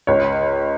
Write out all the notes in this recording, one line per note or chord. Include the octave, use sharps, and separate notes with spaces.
C#2 C#5